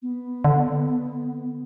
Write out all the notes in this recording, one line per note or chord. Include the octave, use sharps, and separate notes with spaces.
B3
D3